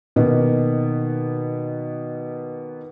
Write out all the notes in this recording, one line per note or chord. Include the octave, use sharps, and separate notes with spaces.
B2 D#3 A#3 B3